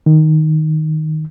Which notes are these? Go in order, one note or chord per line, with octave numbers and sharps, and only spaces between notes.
D#3